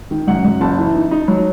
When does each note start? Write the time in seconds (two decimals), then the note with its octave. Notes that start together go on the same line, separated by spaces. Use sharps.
0.11 D#3
0.27 F#2 F#5
0.44 F#2
0.61 F#1 A5
0.78 E3
0.95 D#4
1.11 D#4
1.28 F#3